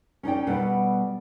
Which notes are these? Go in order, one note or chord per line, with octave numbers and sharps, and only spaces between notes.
C#4 D#4 D5 G5
B2 G3 A4 B4 F#5